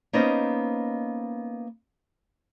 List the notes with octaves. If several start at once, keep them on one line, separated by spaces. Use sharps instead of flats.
A#3 B3 C#4 D#4 C5 D#5